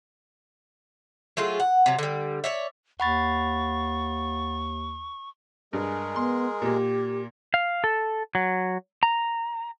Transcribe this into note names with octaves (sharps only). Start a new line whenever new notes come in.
F#3 A3 F4 G#4
F#5
C3 F#3
D3 G3
C#5 D5 E5
D#2 F#5 B5 C#6 A6
G2 G#3 G#4 A#4
B3 C6
A#2 A#3 G4
F5
A4
F#3
A#5